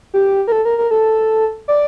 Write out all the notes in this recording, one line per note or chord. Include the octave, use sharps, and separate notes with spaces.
G4
A#4
A4
A#4
A#4
A4
D5